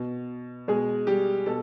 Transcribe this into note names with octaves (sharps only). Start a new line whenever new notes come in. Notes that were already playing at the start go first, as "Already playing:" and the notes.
Already playing: B2
B2 G#3 G#4
G3 G4
B2 A4